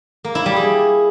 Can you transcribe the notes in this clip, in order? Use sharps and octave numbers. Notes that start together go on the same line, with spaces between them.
A#3
E4
G3
G#4